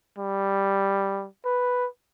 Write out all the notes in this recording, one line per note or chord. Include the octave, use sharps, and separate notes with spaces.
G3
B4